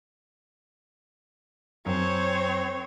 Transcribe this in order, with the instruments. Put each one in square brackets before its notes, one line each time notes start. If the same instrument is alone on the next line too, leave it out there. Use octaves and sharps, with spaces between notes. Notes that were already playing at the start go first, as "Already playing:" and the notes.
[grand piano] F#2 [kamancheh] C4 C#5